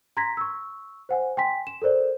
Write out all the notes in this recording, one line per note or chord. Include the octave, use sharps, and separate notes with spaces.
A#5 C6 G#6 A#6 B6
C#6 E6
C5 F#5 G#5
G5 G#5 C6 B6
E7
A4 A#4 C5 D5